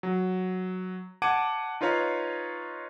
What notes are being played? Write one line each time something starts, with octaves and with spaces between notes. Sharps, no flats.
F#3
F#5 A5 D6 G#6 D7 D#7
D#4 F4 B4 C#5 F5 A#5